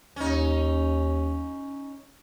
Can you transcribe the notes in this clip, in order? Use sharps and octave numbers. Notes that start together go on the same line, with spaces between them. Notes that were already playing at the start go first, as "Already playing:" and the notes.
D#2 C#4 D#4